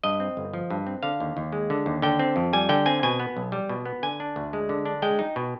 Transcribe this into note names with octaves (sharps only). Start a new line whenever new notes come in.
G2 D#5
C4
G1
F3
G2
C4
D3 F5
D#2
D#2
G#3
D3
D#2
D3 G5
C4
F2
G3 G#5
D3 G5
C4 G#5
B2 G#5
B3
B1
G3
B2
B3
D3 G#5
D4
D2
G#3
D3
D4
G#3 G5
D#4
B2